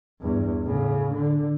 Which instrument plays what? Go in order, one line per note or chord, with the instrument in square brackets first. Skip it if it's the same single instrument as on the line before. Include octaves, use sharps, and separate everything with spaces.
[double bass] E2 G2
A2 C#3
D3